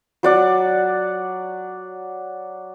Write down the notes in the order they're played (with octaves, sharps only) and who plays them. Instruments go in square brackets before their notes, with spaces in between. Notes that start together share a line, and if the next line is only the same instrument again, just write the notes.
[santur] F#3 D5 F#5